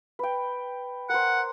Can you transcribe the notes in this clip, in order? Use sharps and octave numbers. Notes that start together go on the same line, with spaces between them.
B4 G5
A#4 C5 F#5